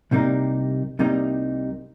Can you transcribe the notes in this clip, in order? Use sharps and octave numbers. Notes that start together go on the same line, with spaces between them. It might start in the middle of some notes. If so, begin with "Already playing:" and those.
C2 C3 G3 A#3 D#4
C2 C3 G3 A#3 D#4